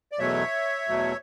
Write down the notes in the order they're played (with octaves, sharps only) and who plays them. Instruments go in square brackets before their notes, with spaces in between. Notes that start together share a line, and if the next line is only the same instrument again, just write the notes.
[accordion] D5
E2 B2 F#3 A3 C#5 E5
E2 B2 F#3 A3